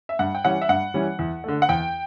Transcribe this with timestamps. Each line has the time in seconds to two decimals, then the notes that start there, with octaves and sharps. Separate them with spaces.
0.09 E5
0.19 G2 F#5
0.35 G5
0.44 E3 G3 C#4 F#5
0.61 E5
0.69 G2 F#5
0.94 E3 G3 C#4
1.19 E2
1.44 D3 A3
1.62 F#5
1.69 E2 G5